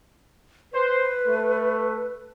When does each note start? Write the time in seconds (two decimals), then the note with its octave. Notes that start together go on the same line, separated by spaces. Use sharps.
0.73 B4 C5
1.25 A3